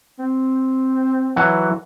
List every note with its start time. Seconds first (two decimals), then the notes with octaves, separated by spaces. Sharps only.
0.19 C4
1.36 E3 F#3 F#4